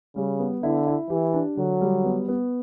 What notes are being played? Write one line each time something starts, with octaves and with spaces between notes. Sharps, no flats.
C#3 G3
B3
D3 E4
E4
E3 G4
D4
D3 F#3
G3
B3
B3